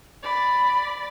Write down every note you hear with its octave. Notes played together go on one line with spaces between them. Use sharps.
D5 B5